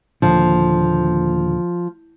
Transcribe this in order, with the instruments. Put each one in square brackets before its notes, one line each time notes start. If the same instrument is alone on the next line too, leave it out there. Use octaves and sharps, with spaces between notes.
[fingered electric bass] D#2 A#2 D3 [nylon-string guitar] F3